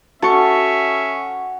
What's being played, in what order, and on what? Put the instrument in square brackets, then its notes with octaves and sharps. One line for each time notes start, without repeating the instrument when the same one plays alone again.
[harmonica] C#4 [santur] F#4 [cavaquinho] A4 C#6 [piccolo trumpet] E5